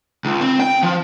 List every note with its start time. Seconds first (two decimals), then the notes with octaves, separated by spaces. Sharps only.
0.25 C#2
0.41 C4
0.60 G5
0.83 F3